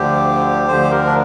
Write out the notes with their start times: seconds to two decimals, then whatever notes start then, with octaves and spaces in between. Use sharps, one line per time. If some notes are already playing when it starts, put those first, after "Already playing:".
Already playing: D2 D3 F3 G4
0.68 D2 D3 F3 C5
0.82 G4
0.90 A#4
1.07 D4